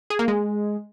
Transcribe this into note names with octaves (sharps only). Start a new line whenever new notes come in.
G#4
A#3
G#3